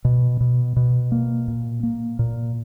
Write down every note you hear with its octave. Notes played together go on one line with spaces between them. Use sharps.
B2
B2
B2
A#3
A#2
A#3
A#2